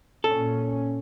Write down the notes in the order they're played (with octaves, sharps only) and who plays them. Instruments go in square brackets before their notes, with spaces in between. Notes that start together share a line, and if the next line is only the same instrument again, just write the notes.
[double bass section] A#2 C#4 [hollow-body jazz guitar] A4